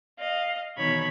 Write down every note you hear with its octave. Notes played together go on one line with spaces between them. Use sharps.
D#5 F5
B2 D#3 E3 C#5 B5 G#6